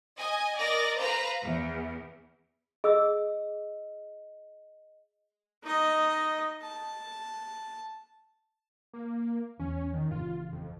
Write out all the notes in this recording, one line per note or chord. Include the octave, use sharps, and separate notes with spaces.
D#5 G#5
A#4 D5 D#5 A#6
B4 C5 F5 A#5
E2
G#4 D#5 E6
D#4 D#5
A5
A#3
E2 C#4
D#3
F#1 C#3 E3 F4
F2